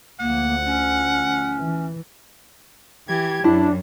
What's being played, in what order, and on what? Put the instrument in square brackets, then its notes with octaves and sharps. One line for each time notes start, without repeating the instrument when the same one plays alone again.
[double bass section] D2 F3 [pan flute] A#3 [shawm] F#5
[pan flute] C#4
[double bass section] E3
[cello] E3 G4 [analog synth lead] G#6
[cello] F#2 [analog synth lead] D4 [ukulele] E4